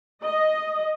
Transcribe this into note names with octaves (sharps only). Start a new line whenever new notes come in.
D#5